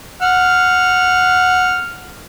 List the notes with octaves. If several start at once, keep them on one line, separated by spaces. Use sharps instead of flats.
F#5 F6